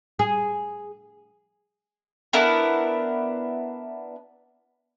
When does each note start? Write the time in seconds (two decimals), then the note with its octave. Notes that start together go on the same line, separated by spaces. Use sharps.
0.19 G#4
2.33 B3 D4 E4 A#4